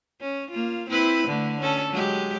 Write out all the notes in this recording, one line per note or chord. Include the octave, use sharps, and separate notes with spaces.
C#4
A#3 F4
C4 E4 B4
D3 A3
C#4 A4
F#3 G#3 G4